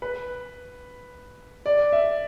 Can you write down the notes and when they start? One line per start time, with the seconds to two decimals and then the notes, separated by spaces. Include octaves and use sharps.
0.02 B4
1.66 D5
1.93 E5